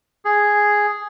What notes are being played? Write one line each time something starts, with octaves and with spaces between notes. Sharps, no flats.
G#4